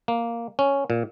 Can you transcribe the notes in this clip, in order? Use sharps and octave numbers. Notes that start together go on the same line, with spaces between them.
A#3
C#4
A#2